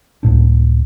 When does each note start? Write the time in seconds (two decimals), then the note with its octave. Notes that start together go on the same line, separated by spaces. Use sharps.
0.23 C#2 A2 D4